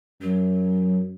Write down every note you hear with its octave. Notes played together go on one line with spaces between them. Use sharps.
F#2 F#3